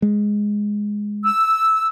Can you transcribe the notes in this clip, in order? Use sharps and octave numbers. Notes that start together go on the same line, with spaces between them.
G#3
E6